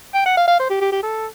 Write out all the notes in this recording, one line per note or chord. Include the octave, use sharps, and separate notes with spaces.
G5
F#5
F5
F5
C5
G4
G4
G4
A4